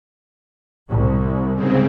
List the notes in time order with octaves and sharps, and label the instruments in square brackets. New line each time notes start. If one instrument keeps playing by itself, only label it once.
[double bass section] C2
[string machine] G#2 C#3 C4